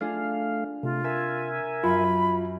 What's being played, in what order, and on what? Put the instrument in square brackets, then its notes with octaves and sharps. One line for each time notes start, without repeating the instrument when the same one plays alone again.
[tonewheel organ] A3 F5 [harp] D4 F4 G#4
[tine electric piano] C3 [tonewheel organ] A3 [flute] F4
[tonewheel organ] A#4 E5 G#5 [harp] E6
[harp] F#2 [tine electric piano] F4 [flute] B5